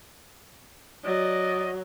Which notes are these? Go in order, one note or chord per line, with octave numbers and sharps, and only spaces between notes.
F#3 D5 D#5